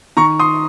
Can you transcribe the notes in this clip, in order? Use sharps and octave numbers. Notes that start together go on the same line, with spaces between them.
D#3 A#5 C#6
C6 D#6